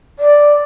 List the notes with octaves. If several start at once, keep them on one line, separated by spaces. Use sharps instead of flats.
D5